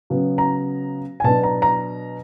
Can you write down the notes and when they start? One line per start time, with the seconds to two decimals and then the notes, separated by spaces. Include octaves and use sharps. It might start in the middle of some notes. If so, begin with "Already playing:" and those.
0.10 C#3 F#3 B3
0.38 A#5
1.20 G#5
1.24 B2 F#3 B3 D4 A5
1.43 A#5
1.62 A#5